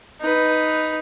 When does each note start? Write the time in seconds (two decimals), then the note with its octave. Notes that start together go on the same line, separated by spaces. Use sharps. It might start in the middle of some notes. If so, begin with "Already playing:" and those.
0.21 D#4 B4